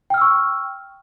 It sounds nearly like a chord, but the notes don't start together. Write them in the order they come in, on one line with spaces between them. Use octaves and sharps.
G5 F6 E6 C#6